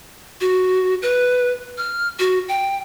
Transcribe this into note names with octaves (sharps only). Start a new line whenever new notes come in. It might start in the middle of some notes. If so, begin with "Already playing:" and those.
F#4
B4
F6
F#4
G5